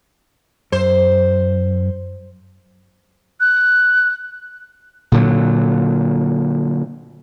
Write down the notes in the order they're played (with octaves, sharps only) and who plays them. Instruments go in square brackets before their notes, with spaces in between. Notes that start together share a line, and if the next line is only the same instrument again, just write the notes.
[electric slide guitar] F#2 [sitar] C5
[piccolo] F#6
[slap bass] A#2 D3 F#3